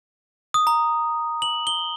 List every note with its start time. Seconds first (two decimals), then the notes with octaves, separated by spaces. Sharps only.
0.54 D#6
0.67 A#5
1.42 F#7
1.67 G7